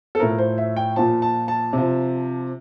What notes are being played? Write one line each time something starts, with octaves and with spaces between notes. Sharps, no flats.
A4
A2 F3 A#4
C5
E5
G5
A#2 F3 A5
A5
A5
C3 F3